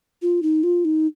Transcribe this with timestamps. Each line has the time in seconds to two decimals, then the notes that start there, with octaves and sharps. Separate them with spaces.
0.22 F4
0.43 D#4
0.63 F4
0.85 D#4